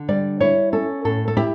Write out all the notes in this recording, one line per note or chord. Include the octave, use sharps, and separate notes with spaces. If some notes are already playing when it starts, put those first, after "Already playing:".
Already playing: D3
G3 D5
E4 C#5
C#4 A4
A2 A4
A4
E4 G4